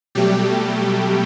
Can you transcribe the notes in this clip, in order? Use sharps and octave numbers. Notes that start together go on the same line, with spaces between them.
B2 F#3 G3 A3 G4